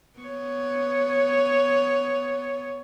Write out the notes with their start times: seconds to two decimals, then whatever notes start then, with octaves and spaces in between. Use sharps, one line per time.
0.19 B3 C#5